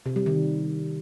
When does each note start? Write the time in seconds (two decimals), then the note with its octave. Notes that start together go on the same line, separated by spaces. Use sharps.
0.06 C3
0.16 G3
0.26 D#3